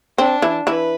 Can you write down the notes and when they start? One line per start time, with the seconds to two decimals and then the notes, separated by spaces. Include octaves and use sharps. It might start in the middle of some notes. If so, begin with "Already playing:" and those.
0.18 C4 D4
0.42 E3 E4
0.67 E3 E4 B4